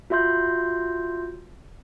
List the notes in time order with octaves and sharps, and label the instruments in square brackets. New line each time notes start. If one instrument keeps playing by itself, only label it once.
[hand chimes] F4 F#4 E5 C6 G6